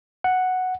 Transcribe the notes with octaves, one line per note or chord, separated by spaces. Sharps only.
F#5